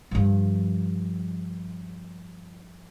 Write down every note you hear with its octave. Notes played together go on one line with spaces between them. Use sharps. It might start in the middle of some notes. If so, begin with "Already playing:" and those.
G2 F3